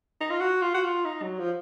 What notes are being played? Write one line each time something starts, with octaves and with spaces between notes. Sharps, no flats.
D#4
F4
F#4
F4
F#4
F4
D#4
F#3
F3